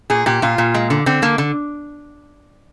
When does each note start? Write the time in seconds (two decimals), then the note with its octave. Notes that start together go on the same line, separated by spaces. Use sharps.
0.10 A#2 G#4
0.26 A#2 G4
0.42 A#2 F4
0.58 A#2
0.74 G#3
0.90 D3
1.06 D3 C4
1.22 D3 A#3
1.38 D3